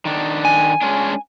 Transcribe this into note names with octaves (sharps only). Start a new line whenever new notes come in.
D#3 D4
G#5
G#3 C#4 D4